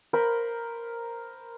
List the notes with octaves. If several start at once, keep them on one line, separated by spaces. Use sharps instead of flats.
A#4 C5 B5